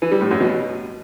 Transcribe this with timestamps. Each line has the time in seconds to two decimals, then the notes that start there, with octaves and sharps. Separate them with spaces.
0.02 E3
0.11 G3
0.21 A2
0.31 F#2
0.40 B2